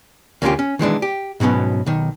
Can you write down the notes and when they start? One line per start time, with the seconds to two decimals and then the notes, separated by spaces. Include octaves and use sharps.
0.42 D2 A#3 C#4 D4 F4 G4
0.59 C#4
0.79 D#3 E3 G#3 D4
1.02 G4
1.40 G#2 B2 F#3 B3 C#4
1.86 B1 D#3